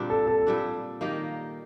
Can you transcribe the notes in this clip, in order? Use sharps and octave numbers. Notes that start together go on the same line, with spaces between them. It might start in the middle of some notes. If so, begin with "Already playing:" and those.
Already playing: A#2 D3 G3 C4 D4
A4
A4
A#2 G3 D4
D#3 A#3 D#4 G4